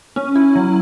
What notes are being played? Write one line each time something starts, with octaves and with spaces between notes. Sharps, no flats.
C#4
E4
F#3